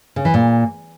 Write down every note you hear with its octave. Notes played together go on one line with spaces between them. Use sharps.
C#3
E3
A#2